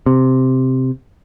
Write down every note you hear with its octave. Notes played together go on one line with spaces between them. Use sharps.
C3